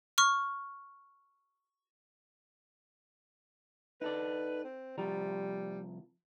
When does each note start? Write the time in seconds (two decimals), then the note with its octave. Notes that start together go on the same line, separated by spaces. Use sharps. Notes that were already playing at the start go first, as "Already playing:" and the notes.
0.18 C#6 F6
4.02 D#4 A4 B4 D5
4.64 C4
4.98 C2 F3 G3 A#5